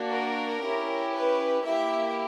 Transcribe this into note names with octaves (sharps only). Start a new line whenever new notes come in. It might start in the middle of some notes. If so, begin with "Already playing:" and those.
Already playing: A#3 D4 F#4
A#4
C#4 E4 G4
B4
A#3 E4 G4 E5